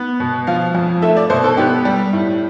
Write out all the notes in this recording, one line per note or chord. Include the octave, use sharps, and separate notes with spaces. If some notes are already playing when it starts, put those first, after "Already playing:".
Already playing: B3
B2
F3 F5
F2
A3 E5
D5
B2 C5
A4
B3 G4
G3
A2